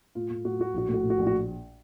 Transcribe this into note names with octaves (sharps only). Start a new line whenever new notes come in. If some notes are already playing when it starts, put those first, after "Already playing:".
A2 F4
A2
A2 F#4
A2 F#4
A#1 F#4
A2
F#4
A2
F#4
A#1
F#4